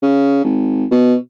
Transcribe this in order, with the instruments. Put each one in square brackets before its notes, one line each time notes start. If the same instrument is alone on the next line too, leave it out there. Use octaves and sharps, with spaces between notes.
[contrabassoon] C#3
G#1
B2